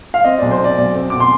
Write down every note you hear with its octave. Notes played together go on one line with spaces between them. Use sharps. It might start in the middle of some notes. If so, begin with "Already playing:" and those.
F5
C4 D#5
B1 D5
C5
C4 D5
B1 D5
C4
B2 D6
C6